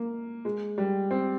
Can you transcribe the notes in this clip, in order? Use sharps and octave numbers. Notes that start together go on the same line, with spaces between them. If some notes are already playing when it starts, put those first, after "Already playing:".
Already playing: A#3
G#3
G3
C4